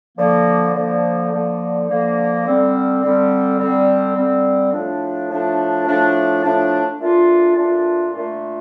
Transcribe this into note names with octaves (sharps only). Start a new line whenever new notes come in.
D3 F3 A#3
D3 F3 A#3
D3 F3 A#3
D3 F3 A#3
D3 G3 C4
D3 G3 C4
D3 G3 C4
D3 G3 C4
A2 F3 A3 D4
A2 F3 A3 D4
A2 F3 A3 D4
A2 F3 A3 D4
A#2 A3 D4 F4
A#2 A3 D4 F4
A#2 A3 D4 F4